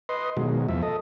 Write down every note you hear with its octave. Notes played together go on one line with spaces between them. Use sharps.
B4 D#5 C6
B2 D#3 F#3 G#3
E2 F3 E5
A4 D#5